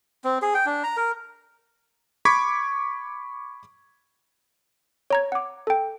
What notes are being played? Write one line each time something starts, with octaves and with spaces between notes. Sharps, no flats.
C4
G#4
G5
D4
A#5
A#4
B5 C#6 D6 G#6 B6
C#5 A#5 G#6
F#5 D6
A4 G5